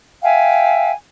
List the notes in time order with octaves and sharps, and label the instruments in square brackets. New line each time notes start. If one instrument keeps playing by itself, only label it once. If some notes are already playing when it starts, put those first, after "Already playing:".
[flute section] E5 F5 G5 G#5